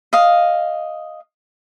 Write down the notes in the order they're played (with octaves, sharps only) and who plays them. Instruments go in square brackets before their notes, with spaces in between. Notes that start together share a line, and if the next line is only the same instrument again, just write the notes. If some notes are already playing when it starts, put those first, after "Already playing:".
[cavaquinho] D#5 F5